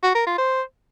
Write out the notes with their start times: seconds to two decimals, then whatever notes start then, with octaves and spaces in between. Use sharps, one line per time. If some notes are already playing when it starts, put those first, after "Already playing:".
0.03 F#4
0.15 A#4
0.27 F4
0.38 C5